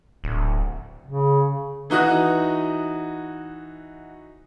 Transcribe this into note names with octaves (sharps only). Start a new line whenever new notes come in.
D1
C#3
E3 D#4 F#4 D#6 F#6